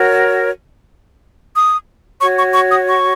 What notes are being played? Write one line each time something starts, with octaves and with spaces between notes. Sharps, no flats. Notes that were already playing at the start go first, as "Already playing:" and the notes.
Already playing: F#4 A#4 C#5
D#6
F#4 C#5 C#6
C#6
C#6
D#6
C#6